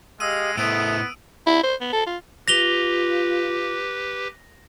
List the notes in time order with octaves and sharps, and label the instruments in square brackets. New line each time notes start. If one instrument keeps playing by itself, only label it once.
[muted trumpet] G#3 [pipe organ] G4 D#5 F5 [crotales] D#6 E6 D#7
[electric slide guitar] A2 E4 C5 [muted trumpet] B3 [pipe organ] A4 E5 [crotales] D7
[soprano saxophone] E4
C5
B3
A4
F4
[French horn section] F4 [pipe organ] G4 B4 [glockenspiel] A#6 F7 G7